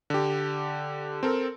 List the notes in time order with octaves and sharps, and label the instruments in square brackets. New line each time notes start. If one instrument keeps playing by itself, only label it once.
[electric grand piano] D3 G4
C4 A4 A#4